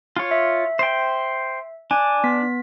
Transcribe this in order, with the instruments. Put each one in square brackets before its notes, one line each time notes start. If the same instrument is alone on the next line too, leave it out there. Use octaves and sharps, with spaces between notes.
[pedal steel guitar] F4 C#5
[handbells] E5
[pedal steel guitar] C5 G5
[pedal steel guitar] D4 [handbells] G#5
[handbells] B3 B6